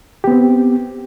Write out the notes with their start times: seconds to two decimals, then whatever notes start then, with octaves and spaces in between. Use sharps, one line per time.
0.24 G4
0.27 B3
0.31 C4